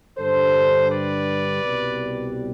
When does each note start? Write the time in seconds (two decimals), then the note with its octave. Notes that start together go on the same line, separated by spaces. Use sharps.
0.18 G2 D3 G3 A4 C5
0.89 B4 D5
1.61 C2 B2 G3